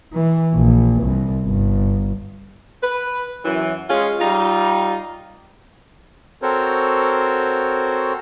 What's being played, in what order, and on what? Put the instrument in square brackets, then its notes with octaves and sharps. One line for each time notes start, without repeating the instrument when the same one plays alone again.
[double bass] E3
A#1
C2
G1
[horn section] B4
F#2 E3
G#3 C#4 F4 G#4
G3 D#4 F4
[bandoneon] C4 F#4 A4 A#4 C5 C#5